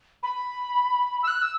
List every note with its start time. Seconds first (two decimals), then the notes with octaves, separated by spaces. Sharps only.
0.23 B5
1.23 E6
1.28 F#6
1.42 E6